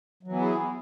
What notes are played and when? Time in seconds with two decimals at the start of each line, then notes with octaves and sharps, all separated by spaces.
0.23 F#3
0.28 E3
0.32 B3
0.37 E4
0.41 G#4